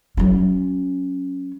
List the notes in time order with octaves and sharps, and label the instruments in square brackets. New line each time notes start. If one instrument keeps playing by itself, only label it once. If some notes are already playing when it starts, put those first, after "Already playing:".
[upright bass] F#3 C#4